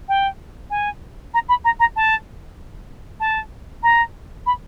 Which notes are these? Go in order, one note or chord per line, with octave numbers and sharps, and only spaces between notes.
G5
G#5
A#5
B5
A#5
A#5
A5
A5
A#5
B5